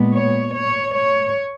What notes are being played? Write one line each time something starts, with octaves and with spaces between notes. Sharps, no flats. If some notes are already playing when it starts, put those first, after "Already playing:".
Already playing: A#2 G#3 B3
C#5
C#5
C#5